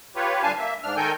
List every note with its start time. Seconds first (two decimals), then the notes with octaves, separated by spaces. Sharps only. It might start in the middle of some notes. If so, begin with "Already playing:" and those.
0.16 F4 G4 B4 C#5
0.43 G2 D3 D4 F5 G#5 A5
0.58 A#3 E5
0.83 G#2 D4 F6
0.97 D#3 A4 A#4 G5 G#5 G6